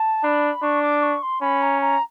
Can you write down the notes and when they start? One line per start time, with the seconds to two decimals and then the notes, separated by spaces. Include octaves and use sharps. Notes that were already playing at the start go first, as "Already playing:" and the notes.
Already playing: A5
0.24 D4 B5
0.62 D4 C#6
0.82 D6
1.02 C#6
1.22 C6
1.41 C#4 B5
1.62 A#5
1.81 A#5